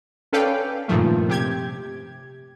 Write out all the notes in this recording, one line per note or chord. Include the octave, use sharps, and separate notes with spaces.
C#4 A4 B4 D5 F5 G5
G2 A#2 D#3 F3 A3
C3 G4 G#6